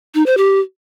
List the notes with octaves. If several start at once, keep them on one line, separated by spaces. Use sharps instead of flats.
D#4
C5
G4